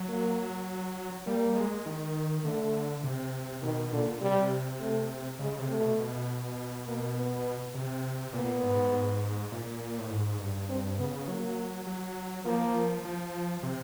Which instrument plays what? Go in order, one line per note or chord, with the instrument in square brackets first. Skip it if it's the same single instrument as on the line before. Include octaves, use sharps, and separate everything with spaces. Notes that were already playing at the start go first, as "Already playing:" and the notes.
Already playing: [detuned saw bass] F#3
[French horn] A#3
[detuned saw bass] G3 [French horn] A#3
[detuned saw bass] G#3
D#3
[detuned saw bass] D3 [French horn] A3
[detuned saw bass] C3
[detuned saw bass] B2 [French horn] D#3
[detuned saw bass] A#2 [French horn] D3
[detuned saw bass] C3 [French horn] G3
[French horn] A3
[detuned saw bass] C#3 [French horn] G#3
[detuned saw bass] C3
[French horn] A3
[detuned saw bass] B2
B2
[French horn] A#3
B3
[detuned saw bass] C3
[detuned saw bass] A#2 [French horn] B3
[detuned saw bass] G#2
G#2
A#2
A2
G#2
G2
[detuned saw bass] G2 [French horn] C4
[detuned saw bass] C#3 [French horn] B3
[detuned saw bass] F#3 [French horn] A#3
[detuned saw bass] F#3
[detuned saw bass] F3 [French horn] A#3
[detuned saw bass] F3
C3